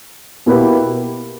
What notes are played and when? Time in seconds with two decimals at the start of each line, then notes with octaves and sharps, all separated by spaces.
0.46 B2 A#3 E4 G4 B4